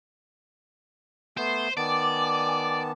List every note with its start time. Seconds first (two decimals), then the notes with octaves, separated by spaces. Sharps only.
1.37 A3 B3 C5
1.77 D#3 B3 D5 G#5 A5 D6